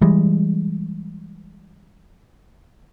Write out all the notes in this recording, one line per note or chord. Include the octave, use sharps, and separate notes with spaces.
E3 G3 G#3